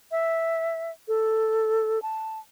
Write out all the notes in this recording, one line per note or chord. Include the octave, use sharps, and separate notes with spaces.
E5
A4
A5